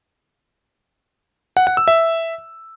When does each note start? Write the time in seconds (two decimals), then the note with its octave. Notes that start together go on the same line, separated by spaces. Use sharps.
1.57 F#5
1.67 F#5
1.77 E6
1.88 E5